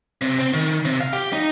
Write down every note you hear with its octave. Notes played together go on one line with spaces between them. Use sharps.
C3
C4
D#3
C3
F5
G4
D#4